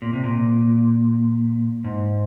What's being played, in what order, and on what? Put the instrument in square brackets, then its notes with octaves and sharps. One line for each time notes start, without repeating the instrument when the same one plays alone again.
[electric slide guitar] A#2
C3
A#2
G#2